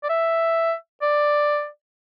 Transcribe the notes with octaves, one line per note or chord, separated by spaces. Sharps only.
D5
E5
D5